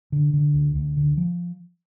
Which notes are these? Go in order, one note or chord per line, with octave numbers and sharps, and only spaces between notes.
D3
D3
D2
D2
D3
F3